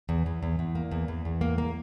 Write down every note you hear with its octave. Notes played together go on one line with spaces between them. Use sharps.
E2
E2
E2
E2
A#3
E2
E2
E2
A#3
A#3